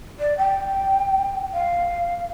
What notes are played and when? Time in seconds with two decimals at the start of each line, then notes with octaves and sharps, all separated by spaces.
0.19 D5
0.37 G5
1.53 F5